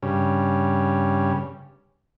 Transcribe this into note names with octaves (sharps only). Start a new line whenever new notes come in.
G2 C#3